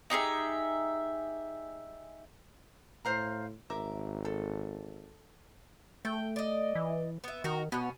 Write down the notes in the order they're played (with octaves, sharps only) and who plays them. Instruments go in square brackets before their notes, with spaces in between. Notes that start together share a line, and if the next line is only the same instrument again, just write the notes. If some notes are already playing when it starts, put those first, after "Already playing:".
[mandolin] D#4 G4 G#4 E5
[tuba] A2 [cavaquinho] C5 F5 A#5
[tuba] G#1 [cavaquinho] A#4 E5 D6
[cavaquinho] A4
[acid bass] A3 [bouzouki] G5
[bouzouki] D5 D#5
[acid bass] E3
[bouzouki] B3 E5
[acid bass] D#3 [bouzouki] F#4 A#4
[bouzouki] B2 C#4 [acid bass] B3